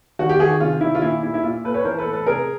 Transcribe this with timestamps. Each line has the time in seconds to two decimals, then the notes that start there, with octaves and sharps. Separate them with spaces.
0.19 D#3 F#4
0.29 G4
0.39 D#3 F#4 G#4
0.60 C3 F4
0.81 D#3 E4
0.95 F4
1.02 A#2 E4
1.23 A#2 E4
1.34 E4
1.43 A#2 F4
1.64 A#2 A4 B4
1.74 B4 C#5
1.85 E3 A#4 C5
1.98 A4 B4
2.06 A2
2.13 A4 B4
2.26 C3 G#4 A#4